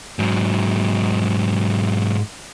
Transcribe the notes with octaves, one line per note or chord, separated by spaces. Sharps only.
G#2 F#3